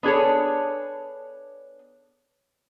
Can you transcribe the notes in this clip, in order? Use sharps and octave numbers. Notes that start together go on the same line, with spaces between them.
B3 D4 G#4 A4 C#5